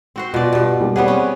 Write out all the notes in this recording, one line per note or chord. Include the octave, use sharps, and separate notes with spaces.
C4 F#4 C5
B2 F4 B4 D5
G2 B2
G3 A#3
G3 B3 C4 G#4 C#5 F#5
C#4